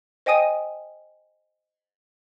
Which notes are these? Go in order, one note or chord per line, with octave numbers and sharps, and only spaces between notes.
C5 D#5 G5 G#5 D#6 D#7